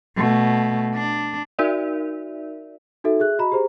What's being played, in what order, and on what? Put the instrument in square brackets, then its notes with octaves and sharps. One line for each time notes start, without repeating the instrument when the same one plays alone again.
[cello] B2 A3
D4
[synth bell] D#4 F#4 A#4 D5 E5
[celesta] D#4 F#4 A4 E5
G#4 E5 F#6
F#4 D#5 A#5 B5
G4 G#4 C5 A#5